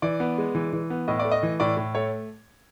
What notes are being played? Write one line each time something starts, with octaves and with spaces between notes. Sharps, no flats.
E3 D5
B3
G#3
E3
E3
B3
A2 D#5
D5
A3
D#5
E3
A2 D5
A2
A3 C#5